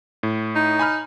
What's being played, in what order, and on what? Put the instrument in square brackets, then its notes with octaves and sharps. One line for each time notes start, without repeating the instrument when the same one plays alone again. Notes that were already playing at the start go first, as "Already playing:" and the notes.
[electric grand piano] A2
[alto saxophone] D#4
[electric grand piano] G#5 B5 F6